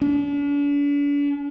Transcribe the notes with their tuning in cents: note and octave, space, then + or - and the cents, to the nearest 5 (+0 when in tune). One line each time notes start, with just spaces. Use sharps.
D4 -45